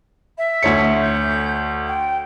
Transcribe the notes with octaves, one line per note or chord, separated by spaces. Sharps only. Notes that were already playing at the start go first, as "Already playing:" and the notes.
E5
D2 C#5 C#7
G6
G5